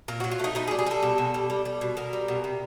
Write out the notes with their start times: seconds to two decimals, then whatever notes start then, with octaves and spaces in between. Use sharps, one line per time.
0.08 A#2 A#4
0.20 F#3 F#4
0.31 F4
0.40 A3 D#4
0.55 B2 D#4
0.67 G#4
0.71 G3
0.79 G#4
0.86 G3 A4
1.03 B2
1.18 B2
1.34 G3
1.50 G3
1.65 G3
1.81 B2
1.97 B2 A#4
2.13 G3
2.28 B2
2.44 C3